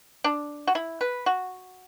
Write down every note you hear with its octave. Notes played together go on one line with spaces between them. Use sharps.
D4
F#4
E4
B4
F#4